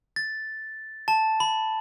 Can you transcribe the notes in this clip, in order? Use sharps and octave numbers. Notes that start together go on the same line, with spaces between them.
A6
A5
B5